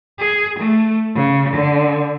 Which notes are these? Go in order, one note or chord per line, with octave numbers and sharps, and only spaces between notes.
G#4
A3
C#3
D3